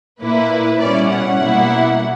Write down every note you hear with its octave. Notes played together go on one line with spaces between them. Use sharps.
A#2 A#3 E4 B4
B2 G3 C#4 E4 D5
F#5
B2 G3 A#3 E4